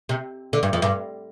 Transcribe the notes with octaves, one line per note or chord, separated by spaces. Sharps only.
C3
D3
G2
F2
G2